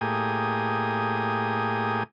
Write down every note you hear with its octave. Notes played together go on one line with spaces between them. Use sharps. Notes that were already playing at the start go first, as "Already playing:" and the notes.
A2 A#3 G4 G#4 D#6